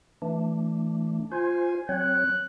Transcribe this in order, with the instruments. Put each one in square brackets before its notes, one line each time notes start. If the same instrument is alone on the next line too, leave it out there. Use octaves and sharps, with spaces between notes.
[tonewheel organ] E3 A3 D4
[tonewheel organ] F4 C5 [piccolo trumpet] G#5
[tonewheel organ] F#3 C4 C#5 [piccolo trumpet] F#6